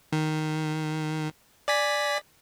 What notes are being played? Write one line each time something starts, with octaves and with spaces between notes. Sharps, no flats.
D#3
D5 G#5 B6